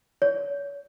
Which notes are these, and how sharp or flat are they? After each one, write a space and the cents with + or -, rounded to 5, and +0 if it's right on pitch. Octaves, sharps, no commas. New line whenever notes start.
C#5 +35